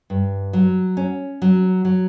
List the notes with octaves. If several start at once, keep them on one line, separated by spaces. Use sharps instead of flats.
G2
F#3
C#4
F#3
F#3